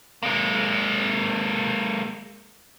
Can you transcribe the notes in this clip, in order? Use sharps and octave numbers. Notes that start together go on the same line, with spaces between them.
G#3 A#3